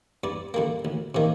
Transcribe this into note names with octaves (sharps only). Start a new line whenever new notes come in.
G2 D5
D3 G3 A#3
D2
C3 D#3 A#3